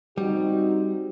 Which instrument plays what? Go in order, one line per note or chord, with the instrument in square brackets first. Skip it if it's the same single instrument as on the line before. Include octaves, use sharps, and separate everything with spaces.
[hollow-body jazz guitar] G3 [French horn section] C4 D#4 F#4